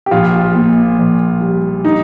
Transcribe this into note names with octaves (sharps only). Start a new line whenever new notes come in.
G4
A#1 F4
A#2
A#1
G3
D#4